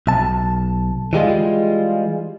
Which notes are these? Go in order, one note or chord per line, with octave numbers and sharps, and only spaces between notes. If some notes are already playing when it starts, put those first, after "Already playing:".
B1 A5
E3 G3 G#3 F4